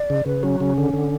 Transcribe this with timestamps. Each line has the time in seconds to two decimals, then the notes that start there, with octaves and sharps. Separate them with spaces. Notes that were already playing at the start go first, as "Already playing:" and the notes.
Already playing: D5
0.10 C#3
0.26 C#3 B4
0.43 F#3 C#4
0.60 C#3 C#4
0.78 D3
0.93 D3